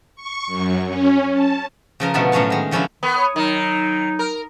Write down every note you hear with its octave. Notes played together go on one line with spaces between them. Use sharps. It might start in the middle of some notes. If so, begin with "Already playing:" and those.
C#6
F#2
C#4
A5
C#3 F3 A#4 A#5
B2 D3 F3 A3 B3 A5
A2 F#3 C#4 F5 A5
D#3 G#3
C#3 F3 C#4 D4 E4
D#3 B3
C#5
D#3 F#3 D#4
A#4